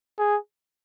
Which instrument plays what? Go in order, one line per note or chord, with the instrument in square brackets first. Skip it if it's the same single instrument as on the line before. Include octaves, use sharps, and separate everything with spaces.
[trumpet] G#4